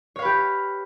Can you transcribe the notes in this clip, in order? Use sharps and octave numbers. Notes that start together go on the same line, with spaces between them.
G4 B4 C#5 F5